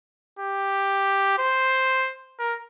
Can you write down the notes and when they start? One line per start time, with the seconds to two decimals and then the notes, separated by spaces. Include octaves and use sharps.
0.39 G4
1.39 C5
2.39 A#4